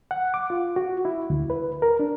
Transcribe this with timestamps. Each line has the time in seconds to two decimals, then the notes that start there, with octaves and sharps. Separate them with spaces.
0.11 F#5
0.34 D6
0.50 F4
0.76 F#4
1.05 E4
1.30 D2
1.50 B4
1.82 A#4
1.99 D4